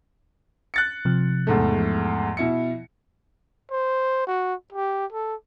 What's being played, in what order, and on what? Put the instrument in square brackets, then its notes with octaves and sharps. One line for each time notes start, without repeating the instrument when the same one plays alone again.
[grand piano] F#6 A6 C#7
[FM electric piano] C3 F3
[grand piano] E2 G#2 A3
[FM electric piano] F3
[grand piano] B2 E4 C#7
[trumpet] C5
F#4
G4
A4